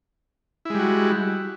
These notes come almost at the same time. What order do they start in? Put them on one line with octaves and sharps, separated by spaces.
E4 G#3 G3 F#4